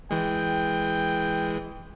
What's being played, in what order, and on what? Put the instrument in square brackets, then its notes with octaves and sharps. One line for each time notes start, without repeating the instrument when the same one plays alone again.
[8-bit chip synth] E3 G#3 [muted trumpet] G5